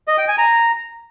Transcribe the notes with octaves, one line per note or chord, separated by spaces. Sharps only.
D#5
G5
G#5
A#5